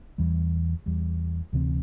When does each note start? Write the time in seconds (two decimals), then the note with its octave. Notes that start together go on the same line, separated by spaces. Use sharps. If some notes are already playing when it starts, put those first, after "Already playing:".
0.18 E2 E3 G3
0.86 E2 E3 G3
1.53 D2 C3 E3 C4